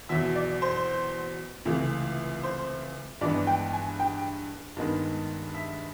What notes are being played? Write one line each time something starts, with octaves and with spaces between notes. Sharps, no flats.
E2 B2 F#3 E5
D5
C5
C#2 C3 E3 A3
C5
G2 E3 G#3 B3 D5
G5
G#5
G5
G2 D#3 G#3 B3
E5